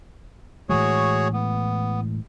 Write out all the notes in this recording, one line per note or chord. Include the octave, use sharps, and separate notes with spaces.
A2 E3 G#3 F#4 G#4 C#5
B3